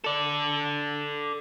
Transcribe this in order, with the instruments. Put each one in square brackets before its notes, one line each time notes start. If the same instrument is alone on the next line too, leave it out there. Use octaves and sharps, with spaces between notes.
[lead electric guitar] A4 D5